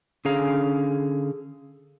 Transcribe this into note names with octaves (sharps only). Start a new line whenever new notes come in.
D3 C#4 G#4 F5 A#5